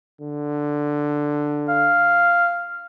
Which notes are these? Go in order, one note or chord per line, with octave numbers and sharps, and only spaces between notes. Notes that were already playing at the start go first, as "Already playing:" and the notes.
D3
F5